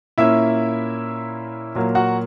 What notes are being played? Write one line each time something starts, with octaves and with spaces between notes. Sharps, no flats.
A#2 A#3 C#4 E4 E5
A#2 F#3 A#3
F#4 F#5